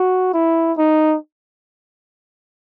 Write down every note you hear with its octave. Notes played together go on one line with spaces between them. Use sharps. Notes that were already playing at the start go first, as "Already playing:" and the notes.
Already playing: F#4
E4
D#4